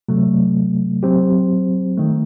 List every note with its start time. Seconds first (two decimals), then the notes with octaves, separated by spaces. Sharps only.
0.09 C3 F#3 A3
1.03 F#3 C4 G4 C5
1.97 D#3 A3